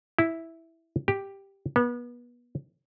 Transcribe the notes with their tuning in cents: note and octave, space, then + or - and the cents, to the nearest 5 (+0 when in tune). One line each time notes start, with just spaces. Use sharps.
E4 -5
G4 +5
B3 -30